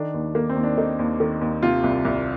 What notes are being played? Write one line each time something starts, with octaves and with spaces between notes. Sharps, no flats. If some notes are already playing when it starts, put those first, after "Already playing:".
Already playing: D#3 D4
D#2
D#3 A#3
C4
D#2
D4
D#3 D#4
D#2
D#3
D#2
C3 F4
C2
C2